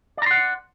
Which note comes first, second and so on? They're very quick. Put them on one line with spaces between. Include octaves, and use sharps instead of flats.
D5 A#5 C6 F#5